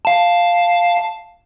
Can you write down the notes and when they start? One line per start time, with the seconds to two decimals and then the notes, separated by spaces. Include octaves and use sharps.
0.05 F5 A5